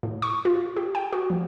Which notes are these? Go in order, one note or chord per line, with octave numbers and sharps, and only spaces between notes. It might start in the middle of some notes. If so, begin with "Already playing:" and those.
A2
C#6
F4
G4
G5
F#4
F3